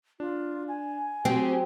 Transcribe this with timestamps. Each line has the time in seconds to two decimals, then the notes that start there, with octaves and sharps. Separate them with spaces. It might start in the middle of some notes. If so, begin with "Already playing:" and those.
0.20 D4 F4
0.68 G#5
1.25 F#3 C4 G4 G#4 C5